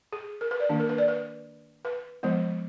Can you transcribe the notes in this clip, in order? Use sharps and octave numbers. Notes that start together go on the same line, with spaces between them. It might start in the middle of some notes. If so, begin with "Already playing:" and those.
G#4
A#4
B4
D5
D#3 A#3 D4
A#4
B4
D5
B4
B4
F3 G#3 B3